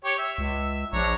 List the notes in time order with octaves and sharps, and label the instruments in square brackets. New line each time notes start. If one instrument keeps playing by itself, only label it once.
[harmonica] G4 C#5
E5
[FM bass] C#2
[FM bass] A#1 [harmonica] D4 C#5 A#5